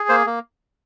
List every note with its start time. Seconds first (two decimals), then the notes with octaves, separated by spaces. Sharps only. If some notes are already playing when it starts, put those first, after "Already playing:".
Already playing: G#4
0.09 A#3 C5
0.26 A#3